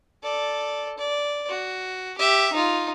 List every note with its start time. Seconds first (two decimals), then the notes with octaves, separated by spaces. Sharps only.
0.23 A4 D5
0.98 D5
1.49 F#4
2.18 G4 E5
2.52 D#4 F4